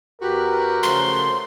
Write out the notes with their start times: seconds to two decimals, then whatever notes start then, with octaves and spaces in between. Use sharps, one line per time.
0.22 E2 F#4 G4 A#4 B4
0.83 C#3 F3 A3 C6